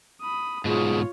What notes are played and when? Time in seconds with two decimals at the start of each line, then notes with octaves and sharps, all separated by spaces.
0.22 B5 D#6
0.65 G#2 B2 F4 G#4 C#5